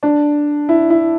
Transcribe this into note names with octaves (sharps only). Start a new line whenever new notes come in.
D4
E4
E4